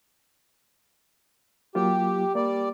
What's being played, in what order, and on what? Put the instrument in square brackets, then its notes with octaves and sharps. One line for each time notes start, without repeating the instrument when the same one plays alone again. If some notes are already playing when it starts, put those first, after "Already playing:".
[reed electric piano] F#3 A#3 F4 [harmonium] G4
[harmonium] G3 D5 [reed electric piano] A#3